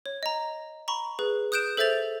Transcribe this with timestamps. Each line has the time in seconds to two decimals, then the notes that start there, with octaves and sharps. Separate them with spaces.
0.06 C#5
0.23 D#5 A#5
0.88 A#5 B5 C#6
1.19 G#4 B4
1.52 D#6 F#6 G6 D7 E7
1.77 A4 C5 E5 G6 A6 F7